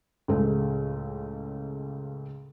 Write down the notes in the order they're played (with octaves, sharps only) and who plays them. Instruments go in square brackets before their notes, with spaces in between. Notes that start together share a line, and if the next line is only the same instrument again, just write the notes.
[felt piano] C#2 A2 C#3 G#3 A3